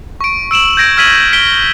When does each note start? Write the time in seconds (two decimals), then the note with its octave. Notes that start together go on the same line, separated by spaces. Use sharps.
0.21 C#6 D7
0.51 E6 D7 E7 F#7
0.77 G6 G#6 A#6 D7
0.97 E6 F6 G#6 B6 D#7 F#7
1.33 B6 D7 G7